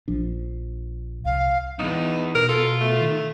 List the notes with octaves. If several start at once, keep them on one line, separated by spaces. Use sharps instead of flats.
A#1 F3 D4
C2 F5
B1 E2 D#4
B2 A#4
F4 A4
A3
D#3